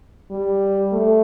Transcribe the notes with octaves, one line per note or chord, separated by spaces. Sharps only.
G3
A3